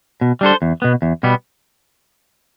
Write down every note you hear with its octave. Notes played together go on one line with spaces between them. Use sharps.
B2
G3 D4 A4 C5
E2
B2 B3
E2
B2 G3 B3